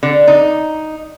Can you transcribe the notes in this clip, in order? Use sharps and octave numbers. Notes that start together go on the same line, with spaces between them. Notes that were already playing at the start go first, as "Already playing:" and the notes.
D3
D#4